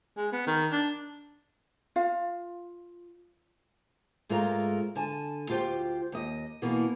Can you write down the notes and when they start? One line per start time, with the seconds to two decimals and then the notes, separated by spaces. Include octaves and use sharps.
0.17 G#3
0.32 B3
0.46 D#3
0.72 D4
1.96 F4 F5
4.29 G#2 G#3 A3 F4 A#4 A#5
4.95 D3 G#5 A5
5.49 D2 F4 G4 C5 G5
6.12 D#2 D#5
6.62 B2 E3 A#3 B3